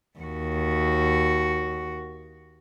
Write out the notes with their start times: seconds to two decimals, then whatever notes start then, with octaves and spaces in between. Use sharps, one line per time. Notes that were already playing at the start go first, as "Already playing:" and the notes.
0.19 D#2 F#4